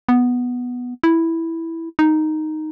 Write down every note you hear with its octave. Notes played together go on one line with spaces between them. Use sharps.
B3
E4
D#4